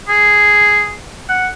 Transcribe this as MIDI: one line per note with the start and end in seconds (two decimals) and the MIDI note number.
0.08 0.94 68
1.29 1.48 78